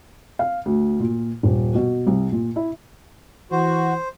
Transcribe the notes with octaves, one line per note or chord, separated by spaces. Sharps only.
F5
D2
A#2
D#1
B2
C2
A#2
E4
E3 F#4 C5